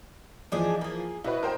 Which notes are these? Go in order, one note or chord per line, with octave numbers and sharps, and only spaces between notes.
E3 F3 G#3 D4 G#4
A#3 G#4
B2 E4 F#4 B4
A#4 C5 G5